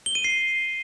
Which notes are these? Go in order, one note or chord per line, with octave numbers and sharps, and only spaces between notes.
G7
D#7
C7